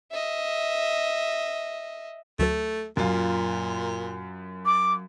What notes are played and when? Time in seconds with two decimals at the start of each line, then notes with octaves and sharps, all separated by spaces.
0.11 D#5 E5
2.39 D2 F#3 A3 A4
2.97 F#2 A#2 F4
4.65 D6